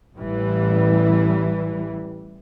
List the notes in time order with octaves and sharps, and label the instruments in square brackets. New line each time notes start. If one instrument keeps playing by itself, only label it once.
[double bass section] A1 E3 G3